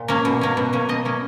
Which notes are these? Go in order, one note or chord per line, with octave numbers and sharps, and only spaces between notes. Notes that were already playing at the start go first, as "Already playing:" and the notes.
Already playing: A#2
A#3 C#4
B2
A#3 C#4
B2
A#3 C#4
B2 D#5
A#3 C#4